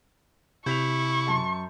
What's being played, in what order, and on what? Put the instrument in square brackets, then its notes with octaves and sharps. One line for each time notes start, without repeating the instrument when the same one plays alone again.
[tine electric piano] C3 [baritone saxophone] E4 [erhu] C#6 [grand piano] G6 B6 F7
[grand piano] F#2 A5 C6